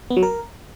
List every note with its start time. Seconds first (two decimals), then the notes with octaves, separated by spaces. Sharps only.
0.10 B3
0.17 F#3
0.23 A#4